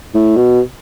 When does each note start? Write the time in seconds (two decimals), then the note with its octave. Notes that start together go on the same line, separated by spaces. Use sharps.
0.14 A2
0.37 B2